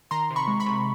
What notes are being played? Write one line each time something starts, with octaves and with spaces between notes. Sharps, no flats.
D#3 A#5 C6
C3
B5 C#6
G#3
B5 C#6
C3